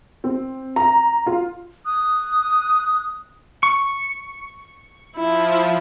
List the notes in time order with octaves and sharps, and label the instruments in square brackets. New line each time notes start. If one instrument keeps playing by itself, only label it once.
[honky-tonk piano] C4
A#5
F4
[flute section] D#6 F#6
[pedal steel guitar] C#6
[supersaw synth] F3 [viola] E4